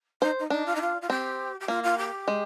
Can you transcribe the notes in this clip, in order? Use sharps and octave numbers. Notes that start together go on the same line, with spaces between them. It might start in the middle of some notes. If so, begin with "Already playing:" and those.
D#4 C5
D#4
D4 D#4
F4
D#4
F4
F4
C4 G4
G4
A#3 F4
F4
G4
G#3